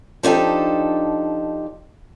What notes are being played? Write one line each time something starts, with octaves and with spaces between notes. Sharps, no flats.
F3 D4 D#4 G4 A4